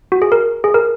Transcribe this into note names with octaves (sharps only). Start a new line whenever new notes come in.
F#4
G#4
A#4
G#4
A#4